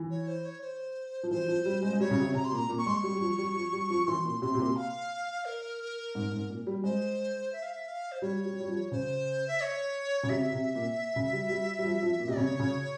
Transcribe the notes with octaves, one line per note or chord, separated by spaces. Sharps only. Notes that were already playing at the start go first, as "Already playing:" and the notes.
Already playing: E3
C#5
C5
C#5
C5
F3
E3 C5
F3
G3
G#3
G#3
G3 C#5
C#3
C3
C3 A#5
C6
A#2
A#5
A#2
C#6
G#3 C6
C#6
G3
G3
F3
G3
F3
G3
F3
E3 C6
A#2
C3 C6
C3
A#2
F5
A#4
G#2
G#2
A#2
G3
G#3 C5
E5
F5
E5
F5
C5
G3 C#5
G3
G3
F3
C#3 C5
E5
C#5
C#3
C3 E5
C3
A#2
C#3
G3
G3
G3
F3
F3
A#2
C3
C#3 C#5
C#3